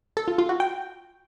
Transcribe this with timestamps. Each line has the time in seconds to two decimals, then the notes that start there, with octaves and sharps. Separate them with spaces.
0.17 A4
0.28 F4
0.38 F4
0.49 F#4
0.60 G5